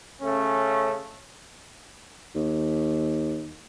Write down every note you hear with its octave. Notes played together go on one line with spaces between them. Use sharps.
C#3 A3 C#4
D#2